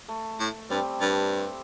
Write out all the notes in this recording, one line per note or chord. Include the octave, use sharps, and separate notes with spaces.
A3
A2
G2 G3 C4
G2